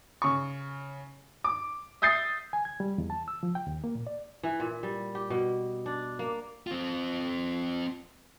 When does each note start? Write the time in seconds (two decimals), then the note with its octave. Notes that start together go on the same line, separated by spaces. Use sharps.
0.22 C#3 C#6
1.44 D6
2.02 E5 D#6 G6 A6 C7
2.53 G#5
2.65 G#6
2.80 G3
2.98 E2
3.10 A5
3.28 E6
3.43 F3
3.55 G5
3.67 D#2
3.84 A#3
3.95 A#2
4.07 D5
4.43 E3
4.60 A#2
4.83 G3
5.15 G4
5.30 B2
5.86 D4
6.19 A#3
6.67 C4 F4